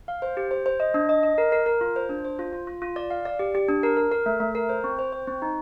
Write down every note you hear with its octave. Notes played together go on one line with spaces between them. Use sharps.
F5
C5
G4
C5
C5
D#5
D4
D#5
D#5
A#4
A#4
A#4
F4
C5
D4
C5
F4
F4
F4
F4
D5
F5
D5
G4
G4
D4
A#4
A#4
A#4
A3
A3
A#4
C5
C4
C5
C5
C4
D#4